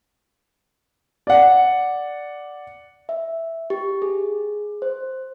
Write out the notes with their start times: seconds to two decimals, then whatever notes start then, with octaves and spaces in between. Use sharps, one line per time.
1.27 D5 F#5
3.09 E5
3.70 G4
4.02 G#4
4.82 C5